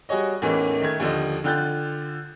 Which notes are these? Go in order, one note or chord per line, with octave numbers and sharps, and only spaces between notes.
G3 F#4 G#4 C#5 D#5
E2 A2 E3 A#3 C#4 D#4
D#3 A3 G#6
D#2 D3 F3 D#5
D3 F4 G5 F#6 G6 A6